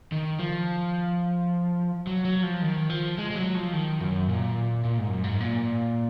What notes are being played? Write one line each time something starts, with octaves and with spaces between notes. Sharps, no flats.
D#3
F3
F#3
F#3
F3
D#3
F3
G#3
G#3
F#3
F3
D#3
F#2
A#2
A#2
G#2
F#2
G#2
A#2